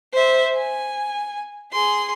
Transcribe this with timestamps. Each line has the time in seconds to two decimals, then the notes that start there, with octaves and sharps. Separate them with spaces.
0.14 C5 E5
0.57 G#5
1.73 G#4 C6